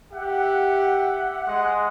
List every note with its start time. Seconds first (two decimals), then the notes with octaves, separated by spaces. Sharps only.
0.13 G4 E5 F#5
1.48 G#3 F#5